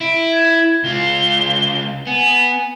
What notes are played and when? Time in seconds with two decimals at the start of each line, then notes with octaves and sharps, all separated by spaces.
0.01 E4 D7
0.32 G#6
0.84 C#2 F4 G7
2.07 B3 G#5